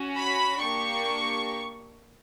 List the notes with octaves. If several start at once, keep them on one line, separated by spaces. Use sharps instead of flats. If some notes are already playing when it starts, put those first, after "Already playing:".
Already playing: C#4 F#4
B5
A#3 D4 G4 C#6